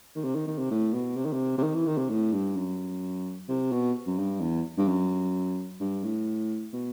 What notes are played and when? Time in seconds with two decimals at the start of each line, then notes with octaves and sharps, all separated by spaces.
0.15 D#3
0.24 C3
0.35 D#3
0.47 D#3
0.58 C3
0.71 A2
0.93 B2
1.16 C3
1.25 D#3
1.33 C3
1.58 C3
1.63 D#3
1.74 E3
1.86 D#3
1.97 C3
2.10 A2
2.32 G2
2.56 F#2
3.48 C3
3.72 B2
4.07 F#2
4.18 G2
4.41 E2
4.78 G2
4.88 F#2
5.80 G2
6.03 A2
6.73 B2